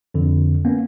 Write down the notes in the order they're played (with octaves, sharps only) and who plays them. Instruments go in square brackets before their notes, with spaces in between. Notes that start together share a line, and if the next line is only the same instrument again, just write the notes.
[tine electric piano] F2 D3
A#3 B3 C#4